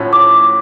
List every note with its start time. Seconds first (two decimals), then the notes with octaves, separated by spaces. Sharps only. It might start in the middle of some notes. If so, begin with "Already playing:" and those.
Already playing: A2 F3 A3 C#4 F#4
0.13 D6